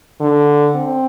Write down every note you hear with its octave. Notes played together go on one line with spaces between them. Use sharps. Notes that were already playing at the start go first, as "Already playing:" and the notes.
D3
C4